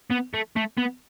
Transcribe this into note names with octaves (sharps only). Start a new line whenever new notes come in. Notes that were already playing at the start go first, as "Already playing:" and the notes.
B3
A3
A3
B3